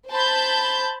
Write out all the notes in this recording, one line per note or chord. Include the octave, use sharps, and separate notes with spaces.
C5 A5 B5 G6